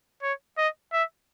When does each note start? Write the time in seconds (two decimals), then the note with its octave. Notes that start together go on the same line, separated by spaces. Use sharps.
0.23 C#5
0.58 D#5
0.93 E5